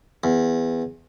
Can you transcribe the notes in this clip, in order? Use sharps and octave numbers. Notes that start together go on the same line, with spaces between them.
E2